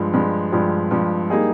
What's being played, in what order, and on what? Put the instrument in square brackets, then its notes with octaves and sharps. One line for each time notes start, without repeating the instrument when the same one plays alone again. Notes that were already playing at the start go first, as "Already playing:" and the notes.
Already playing: [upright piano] G2 F3 G#3
G2 F3 G#3
G2 F3 G#3
G2 F3 G#3
G3 A#3 D#4 G#4